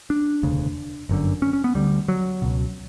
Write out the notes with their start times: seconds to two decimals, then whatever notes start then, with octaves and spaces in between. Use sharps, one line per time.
0.10 D4
0.43 E1 D2 C#3
1.09 G1 F#2 D3
1.42 C#4
1.53 C#4
1.64 B3
1.75 D2 D3 G3
2.08 F#3
2.42 C#2 B2